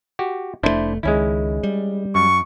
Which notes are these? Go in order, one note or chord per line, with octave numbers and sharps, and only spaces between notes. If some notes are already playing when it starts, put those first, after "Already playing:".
F#4 G4
F1 C3 A3 D4 E4 C5
C#2 D#3 G#3 C#4 E4
G3
F#2 C#6